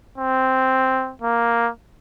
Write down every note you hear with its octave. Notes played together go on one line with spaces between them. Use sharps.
C4
A#3